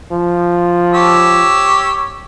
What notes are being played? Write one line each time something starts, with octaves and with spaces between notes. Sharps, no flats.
F3
G4 C#5 E6